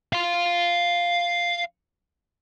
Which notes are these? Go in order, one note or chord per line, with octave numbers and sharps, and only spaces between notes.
F5 C6